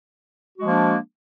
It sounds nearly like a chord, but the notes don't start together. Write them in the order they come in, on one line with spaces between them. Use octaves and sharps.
F#4 G#3 F3 A#3 D4